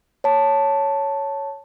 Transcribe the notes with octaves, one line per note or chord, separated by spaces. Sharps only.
C#5 A5